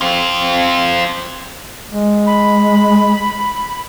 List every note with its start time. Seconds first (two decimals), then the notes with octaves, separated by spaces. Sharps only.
0.01 C4 F4
1.90 G#3
2.27 B5